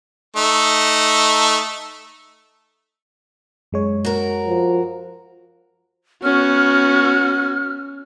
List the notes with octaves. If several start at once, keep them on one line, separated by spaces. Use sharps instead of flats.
A3 D#4
F#2 G#3 C#5
F#4 A#4
F3
B3 C#4 F#4 F6